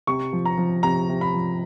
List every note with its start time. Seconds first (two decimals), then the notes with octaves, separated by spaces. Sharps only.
0.07 C3 C#6
0.33 F3
0.45 A#5
0.58 F3
0.83 C3 A#5
1.09 C3
1.21 B5
1.34 F3